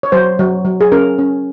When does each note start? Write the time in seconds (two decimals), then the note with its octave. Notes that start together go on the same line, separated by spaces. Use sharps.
0.03 C#5
0.12 F#3 C5
0.39 F#3
0.65 F#3
0.81 G#4
0.92 C#4 A#4
1.18 C#4